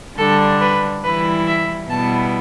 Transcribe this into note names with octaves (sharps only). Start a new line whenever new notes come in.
D3 G3 D4 A4
B4
E3 G3 E4 B4
E5
B2 G3 B3 E4 A5